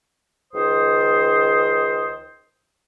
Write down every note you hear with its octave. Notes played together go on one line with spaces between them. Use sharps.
C#2 D#3 C5 D#6